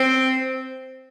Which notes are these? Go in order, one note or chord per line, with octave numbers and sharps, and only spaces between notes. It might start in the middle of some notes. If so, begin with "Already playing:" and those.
Already playing: C4